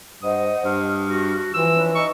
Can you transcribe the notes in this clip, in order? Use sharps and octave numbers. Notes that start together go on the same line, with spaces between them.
G2 C5 D#5 F#5 D#6
G2 F6
F#4
E3 F3 C6 E6
C#4 D4 B4
D#4 D#5 C#6 E6